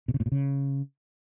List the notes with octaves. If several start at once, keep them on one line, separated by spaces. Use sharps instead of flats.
B2
C#3
A2
A#2
C#3